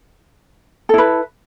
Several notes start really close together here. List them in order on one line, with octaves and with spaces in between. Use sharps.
A4 E4 B4